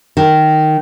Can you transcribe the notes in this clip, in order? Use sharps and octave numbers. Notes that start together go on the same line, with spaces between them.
D#3